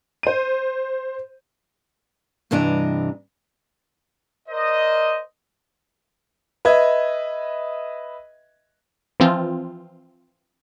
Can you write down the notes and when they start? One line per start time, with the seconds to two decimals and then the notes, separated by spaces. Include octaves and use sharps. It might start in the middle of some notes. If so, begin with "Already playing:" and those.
0.23 C5 D#7
2.51 G2 C3 E3 D4 D#5 A#5
4.49 A#4 C5 D5 D#5
6.65 B4 D#5 E5 G#6
9.20 E3 F3 C4 F4